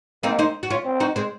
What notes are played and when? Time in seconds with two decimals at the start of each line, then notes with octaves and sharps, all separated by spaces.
0.23 A#3 C4 D#4
0.39 C4 D#4
0.63 F#4
0.70 C#4 F4
0.85 C4
1.00 D#4 F#4
1.16 G#3 C4